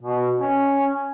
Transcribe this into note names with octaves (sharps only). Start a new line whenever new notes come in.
B2
C#4